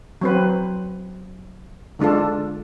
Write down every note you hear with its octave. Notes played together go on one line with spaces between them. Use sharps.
F#3 C4 B4
D3 G#3 D4 F4 A4